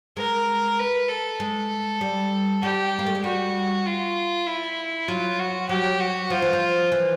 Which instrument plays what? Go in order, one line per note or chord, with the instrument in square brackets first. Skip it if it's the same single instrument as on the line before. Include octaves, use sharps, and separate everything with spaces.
[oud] G#3 [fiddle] A#4
[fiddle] B4
A4
[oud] G#3
G3
[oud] G3 [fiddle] G4
[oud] A#3
A3
G#3
[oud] G3 [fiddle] F#4
[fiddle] F4
E4
[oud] F#3 [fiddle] F4
[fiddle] F#4
[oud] F#3 [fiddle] G4
[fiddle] F#4
[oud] F3 [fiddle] F4
[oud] E3
F3
E3